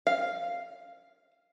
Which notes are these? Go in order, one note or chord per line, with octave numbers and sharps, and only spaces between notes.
F5